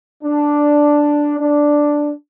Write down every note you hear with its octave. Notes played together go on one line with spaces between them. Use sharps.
D4
D4